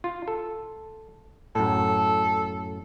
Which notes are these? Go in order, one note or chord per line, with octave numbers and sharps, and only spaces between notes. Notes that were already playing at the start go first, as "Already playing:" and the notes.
F4
A4
F#2 A2 A4